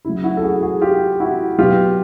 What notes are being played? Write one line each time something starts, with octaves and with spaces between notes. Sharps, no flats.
C#3 F#3 E4
E4 F#4
A4
F#4 G#4
F#4 G#4
F4 G4
E4 F#4
B2 F#3 F4 G4